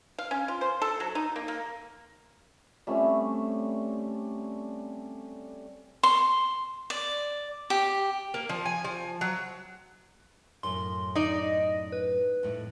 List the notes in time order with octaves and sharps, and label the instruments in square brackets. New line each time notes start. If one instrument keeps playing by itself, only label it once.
[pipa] F5
C#4
F4
C5
A4
F#3
D#4
A#3
A#3
[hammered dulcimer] G3 A3 C4 C#4
[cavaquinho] C6
D5
G4
[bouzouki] A#3
F3
G#5
F3
F#3
[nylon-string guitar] F#2 A2 [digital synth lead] C6
[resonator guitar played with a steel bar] D#4 D5 [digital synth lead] D#5
[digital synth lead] B4
[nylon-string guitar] F2 A2